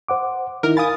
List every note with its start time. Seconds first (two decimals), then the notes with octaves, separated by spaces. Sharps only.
0.08 C5 F#5 D6
0.63 D#3 D#4 E4 A#4
0.77 F5 G#5 B5 D#6 A6